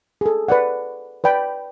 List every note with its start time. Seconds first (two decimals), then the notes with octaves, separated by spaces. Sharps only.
0.21 G#4 A4
0.48 B4 D5 F#5
1.24 B4 D5 G5 B5